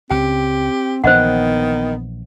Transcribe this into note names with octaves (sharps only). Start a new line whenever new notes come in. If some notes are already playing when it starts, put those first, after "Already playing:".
C#2 C#3 C4 G4 G5
A#1 D#3 E3 B3 C5 D#5 F#5